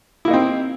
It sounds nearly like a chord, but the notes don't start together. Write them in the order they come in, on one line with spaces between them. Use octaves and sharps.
E4 A#3 D#4 C4